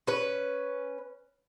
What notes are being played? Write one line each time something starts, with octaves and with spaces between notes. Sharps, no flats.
C#4 B4